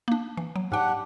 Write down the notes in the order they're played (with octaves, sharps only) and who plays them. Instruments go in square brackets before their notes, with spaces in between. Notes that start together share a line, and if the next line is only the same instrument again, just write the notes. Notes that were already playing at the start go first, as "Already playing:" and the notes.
[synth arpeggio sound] A#3 D4
E3
F#3
[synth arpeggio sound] G#2 G5 [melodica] D4 G4 F#5